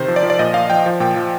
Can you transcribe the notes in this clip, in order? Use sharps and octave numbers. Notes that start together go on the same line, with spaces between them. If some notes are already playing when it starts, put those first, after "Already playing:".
Already playing: C3 D#3 C5
F3
D5
F3
D5
A#2 D#5
A#2 F5
F3 G5
F3
A#2 G5
F3